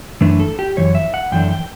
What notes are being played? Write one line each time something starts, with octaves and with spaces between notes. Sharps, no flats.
F#2 E3 A3 D4 B4
A4
G4
F#2 E3 C#5
E5
F#5
F#2 E3 A3 D4 G5
G5